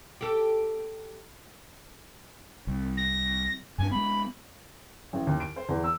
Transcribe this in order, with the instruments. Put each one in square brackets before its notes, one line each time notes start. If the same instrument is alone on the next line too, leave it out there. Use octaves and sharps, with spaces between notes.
[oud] G4 A4
[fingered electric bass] C2
[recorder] A#6
[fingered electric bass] G2 D4 [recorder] G#5
[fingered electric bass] G#3 B3 [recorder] B5
[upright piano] A1
D#2
D7
C5
E2
E6